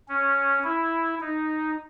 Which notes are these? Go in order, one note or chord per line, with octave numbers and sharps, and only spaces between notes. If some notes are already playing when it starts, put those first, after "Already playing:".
C#4
E4
D#4